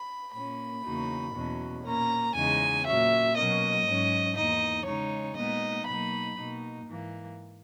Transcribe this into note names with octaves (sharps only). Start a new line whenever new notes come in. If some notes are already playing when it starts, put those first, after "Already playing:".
Already playing: B5
A#2 A#3 C#4 B5
E2 C#3 F#3 A#3 D#4
E2 B2 F#3 C#4
A#2 A#3 C#4 A#5
E2 C#3 G#3 D#4 G#5
A#2 F#3 C#4 E5
B2 F#3 A#3 C#4 D#5
G#2 F#3 C#4
E2 D#3 A#3 D#4 D#5
C#3 G#3 D#4 C#5
A#2 G#3 B3 D#4 D#5
B2 F#3 A#3 D#4 B5
B2 A#3 D#4
G#2 E3 A#3